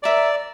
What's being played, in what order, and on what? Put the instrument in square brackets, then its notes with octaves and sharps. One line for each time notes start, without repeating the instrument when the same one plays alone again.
[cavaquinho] A#4 E5 A#5 [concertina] D5